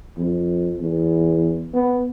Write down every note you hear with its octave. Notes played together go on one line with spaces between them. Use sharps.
F2
E2
B3